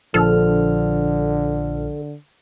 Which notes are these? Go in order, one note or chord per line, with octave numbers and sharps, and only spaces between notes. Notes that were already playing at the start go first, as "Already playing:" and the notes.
A#1 D3 F3 A4 F6